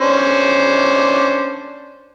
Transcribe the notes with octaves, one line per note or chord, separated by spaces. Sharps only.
C#4 D4 C5